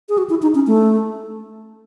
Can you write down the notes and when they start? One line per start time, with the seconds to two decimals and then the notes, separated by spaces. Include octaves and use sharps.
0.09 G#4
0.18 F#4
0.30 E4
0.42 D#4
0.55 C#4
0.67 A3